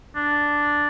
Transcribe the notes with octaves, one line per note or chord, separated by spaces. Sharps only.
D4